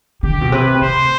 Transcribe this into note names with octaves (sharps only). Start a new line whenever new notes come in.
D3 G4
B2
C3 B4
A2 C5